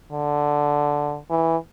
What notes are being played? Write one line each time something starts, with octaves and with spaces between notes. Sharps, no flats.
D3
E3